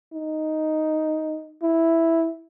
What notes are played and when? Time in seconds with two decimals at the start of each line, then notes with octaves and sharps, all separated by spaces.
0.13 D#4
1.63 E4